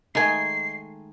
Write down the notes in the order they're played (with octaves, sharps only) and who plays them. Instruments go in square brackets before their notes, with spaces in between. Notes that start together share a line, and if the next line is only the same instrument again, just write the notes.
[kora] D#3 G#3 A3 [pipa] D#4 G#5 [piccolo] C7